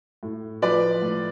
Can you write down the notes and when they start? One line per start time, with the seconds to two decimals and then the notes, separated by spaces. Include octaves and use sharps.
0.23 A2
0.62 F3 B4 D5
1.02 A2